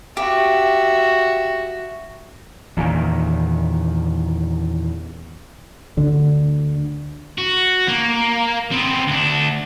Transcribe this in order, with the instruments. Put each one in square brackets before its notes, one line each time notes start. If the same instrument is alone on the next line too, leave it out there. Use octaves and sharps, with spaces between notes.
[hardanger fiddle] F#4 E5 [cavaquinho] G4
[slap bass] E2 A#2 D#3
[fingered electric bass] D2 D3
[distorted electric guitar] F#4
A#3
B3 C4
D2 D4